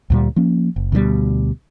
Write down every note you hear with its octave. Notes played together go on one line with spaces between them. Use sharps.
D2 A#2 G3
F3 A#3 C#4
F#1
D2 B2 D3 G3